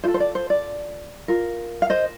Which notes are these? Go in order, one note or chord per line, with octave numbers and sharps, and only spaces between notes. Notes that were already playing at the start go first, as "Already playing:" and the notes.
F4 A4 C5
C5
D5
C5
D5
F4 A#4
F5
C5 D#5